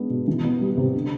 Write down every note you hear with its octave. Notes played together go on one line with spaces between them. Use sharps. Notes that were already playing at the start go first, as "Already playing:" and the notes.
Already playing: G#3 B3 D4
B2
E3
B3
G3
C3
D3